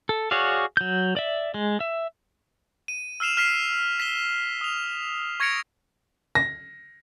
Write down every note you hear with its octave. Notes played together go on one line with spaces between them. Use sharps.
A4
F#4 G#4 C#5 D5 F5
F#3 G6
D5 E5
G#3
E5
D#7
E6 F6 C7 E7 F7
F6 B6 C7
B6 E7 G7
D#6 F7
C#6 G#6 A#6 C#7 D7 F7
A#6